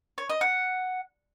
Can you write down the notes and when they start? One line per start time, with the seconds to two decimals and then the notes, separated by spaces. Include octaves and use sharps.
0.18 C#5
0.29 D#5
0.41 F#5